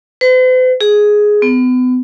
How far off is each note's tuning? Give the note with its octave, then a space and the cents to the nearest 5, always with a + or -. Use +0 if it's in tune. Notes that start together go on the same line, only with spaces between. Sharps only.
C5 -45
G#4 +5
B3 +35